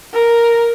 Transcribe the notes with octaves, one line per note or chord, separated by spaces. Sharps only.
A#4